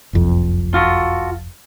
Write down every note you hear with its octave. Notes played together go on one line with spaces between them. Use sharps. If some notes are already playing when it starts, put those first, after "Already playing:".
F#1 C2 F2
F4 F#4 A4